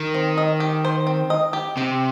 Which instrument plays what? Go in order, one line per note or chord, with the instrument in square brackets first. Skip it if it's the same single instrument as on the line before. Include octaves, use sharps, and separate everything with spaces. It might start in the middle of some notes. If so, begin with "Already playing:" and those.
Already playing: [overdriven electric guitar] D#3
[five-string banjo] C4
D#5
G4
C5
C4
D#5
G4
[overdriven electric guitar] C3 [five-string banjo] G4